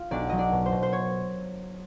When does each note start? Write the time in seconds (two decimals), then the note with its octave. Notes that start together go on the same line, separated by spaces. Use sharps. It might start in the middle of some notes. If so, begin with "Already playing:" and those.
Already playing: F4 F5
0.11 B1 D4 D5
0.29 F#3 D#5
0.38 D4 D5
0.52 B2
0.66 C5
0.72 B2
0.83 C5
0.93 C#5